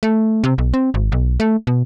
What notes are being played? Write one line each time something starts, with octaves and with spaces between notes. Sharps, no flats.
A3
C3
B1
C4
G#1
B1
A3
B2